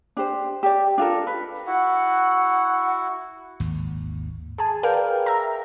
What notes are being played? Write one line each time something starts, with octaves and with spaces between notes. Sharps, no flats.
D4 G4 C5
G4 D5
D4 F4 A4 A#4
B4
E4 F#4 F#5
G#1 D#2
G#4 G#5 A5
A#4 B4 D5 F5 G5
E5 A#5